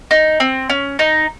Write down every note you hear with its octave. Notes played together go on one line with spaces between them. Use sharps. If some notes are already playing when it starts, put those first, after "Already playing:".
D#4
C4
C#4
D#4